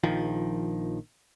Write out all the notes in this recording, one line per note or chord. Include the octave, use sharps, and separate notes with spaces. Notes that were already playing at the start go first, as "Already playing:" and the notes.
A#1 D#3 F3